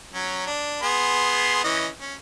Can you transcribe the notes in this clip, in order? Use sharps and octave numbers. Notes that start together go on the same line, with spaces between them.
F#3 C#4
D4
B3 G#4 C6
E3 C#4 D#5
C#4